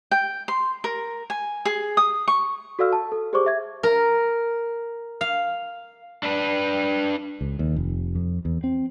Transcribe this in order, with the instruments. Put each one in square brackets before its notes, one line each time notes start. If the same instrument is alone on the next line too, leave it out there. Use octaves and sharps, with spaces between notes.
[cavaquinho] G5
C6
A#4
G#5
G#4
D#6
C#6
[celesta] F#4 A4 D5 F5 E6 F6
A5
A4
G4 G#4 C5 D5 C#6 D6
E5 G#6
[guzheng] A#4
F5
[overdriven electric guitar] D4 B4
[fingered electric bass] C#2
D#2
F1
F2
E2
C4